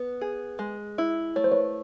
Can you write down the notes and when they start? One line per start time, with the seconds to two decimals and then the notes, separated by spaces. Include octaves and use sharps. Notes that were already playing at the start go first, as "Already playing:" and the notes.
Already playing: B3 B4
0.21 G#4
0.59 G#3
0.98 E4
1.36 A3 C#5
1.44 C5
1.52 B4 C#5